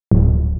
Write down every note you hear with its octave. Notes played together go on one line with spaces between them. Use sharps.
D1